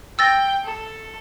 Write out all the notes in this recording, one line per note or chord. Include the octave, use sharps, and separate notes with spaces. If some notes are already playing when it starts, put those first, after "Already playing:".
G5 E6 A6 A#6
A4